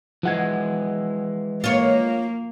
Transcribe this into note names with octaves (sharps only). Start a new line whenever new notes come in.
E3 F3 G#3 F#5 G#6
A#3 F4 C#5